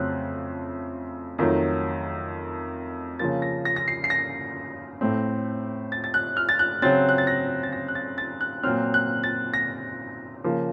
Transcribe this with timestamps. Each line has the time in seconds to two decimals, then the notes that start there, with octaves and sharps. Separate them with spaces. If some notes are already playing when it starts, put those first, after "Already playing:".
Already playing: F2 C#3 F#3 A3 C4 F#6
1.38 F2 D#3 F#3 A3
3.19 C#3 F3 A#3 A6
3.42 A#6
3.65 A#6
3.76 A#6
3.88 C7
4.04 C7
4.10 A#6
5.01 A2 A3 C4
5.92 A6
6.04 A6
6.14 F#6
6.37 F6
6.49 A6
6.59 F#6
6.82 C#3 F#3 C4 A6
7.09 F#6
7.18 A6
7.27 A#6
7.63 A6
7.73 A#6
7.88 F#6
7.95 A6
8.18 A6
8.41 F#6
8.63 A#2 F#3 C4 F6
8.94 F#6
9.24 A6
9.54 A#6
10.44 C#3 F3 A#3